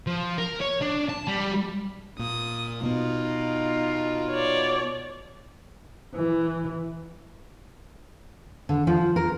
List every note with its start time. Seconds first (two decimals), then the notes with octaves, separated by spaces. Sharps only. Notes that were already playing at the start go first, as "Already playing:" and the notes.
0.07 F3
0.38 A#4
0.61 C#5
0.81 D4
1.09 A5
1.28 G3
2.19 A#2 D#6
2.83 B2 B3 D#4 F4
4.31 C#5 D5
6.16 E3
8.69 D3
8.87 F3
9.16 A#4